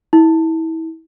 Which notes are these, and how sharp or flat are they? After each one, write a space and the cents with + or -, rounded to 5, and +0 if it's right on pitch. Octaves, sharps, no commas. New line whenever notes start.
E4 -30